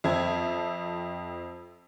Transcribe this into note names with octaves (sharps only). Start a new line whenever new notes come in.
F2 C4 E5 A5 G#6